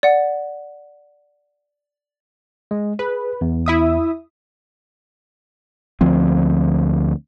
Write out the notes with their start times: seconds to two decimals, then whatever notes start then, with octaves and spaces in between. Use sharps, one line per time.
0.03 D5 F#5
2.71 G#3
2.99 G#4 B4
3.41 E2
3.66 E4 E5 D#6
6.01 D2 F3 C4